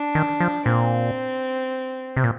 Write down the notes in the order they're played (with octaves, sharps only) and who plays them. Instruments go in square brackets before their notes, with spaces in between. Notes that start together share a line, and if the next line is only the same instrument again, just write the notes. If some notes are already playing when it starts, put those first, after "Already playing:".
Already playing: [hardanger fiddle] D4
[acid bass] D#3
F3
[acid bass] A#2 [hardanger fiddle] C4
[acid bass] C3
A#2